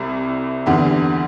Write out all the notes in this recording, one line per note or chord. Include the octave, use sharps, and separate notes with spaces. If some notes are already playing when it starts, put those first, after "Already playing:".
Already playing: C2 C3 G3 E4
E2 D3 G3